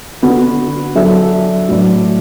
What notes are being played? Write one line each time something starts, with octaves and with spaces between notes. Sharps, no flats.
D3 B3 F#4
F#3 D4 A4 E5
A2 F#3 D4 B4 D5